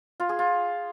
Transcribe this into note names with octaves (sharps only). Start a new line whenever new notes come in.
F4
G#4
F4